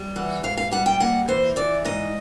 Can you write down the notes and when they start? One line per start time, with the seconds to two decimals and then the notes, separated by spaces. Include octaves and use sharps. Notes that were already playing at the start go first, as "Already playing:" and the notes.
Already playing: G3
0.16 E3 F#5
0.43 G#2 F5
0.57 F5
0.71 G3 F#5
0.86 G5
1.00 A#3 F#5
1.28 E3 C5
1.56 E3 D5
1.85 G#2 D#5